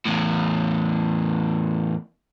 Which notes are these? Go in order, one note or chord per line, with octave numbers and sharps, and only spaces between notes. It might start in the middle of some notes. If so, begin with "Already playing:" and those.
E2 A2